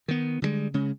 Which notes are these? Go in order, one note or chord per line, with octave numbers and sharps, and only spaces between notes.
D#3 B3
D3 D#3 G3 G#3
C#3 G#3 C#4